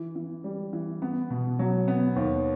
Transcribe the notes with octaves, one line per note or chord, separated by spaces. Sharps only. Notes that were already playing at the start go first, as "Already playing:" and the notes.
Already playing: E3
E3
G3
E3
B3
B2
F#3
B3
D#2